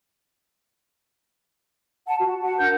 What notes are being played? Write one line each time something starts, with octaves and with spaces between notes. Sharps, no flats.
F#5 A5
F#4
F#5 A5
D4 A#4 F#5 G6